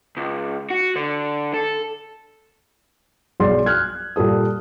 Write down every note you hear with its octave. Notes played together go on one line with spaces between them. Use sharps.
C#2
F#4
D3
A4
B1 G#4 D5 C6 A6
F6 F#6 G#6
A#2 G3 A4 D#6